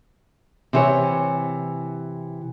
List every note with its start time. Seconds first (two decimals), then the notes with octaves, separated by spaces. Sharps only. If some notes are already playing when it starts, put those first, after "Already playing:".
0.73 C3 E3 C#5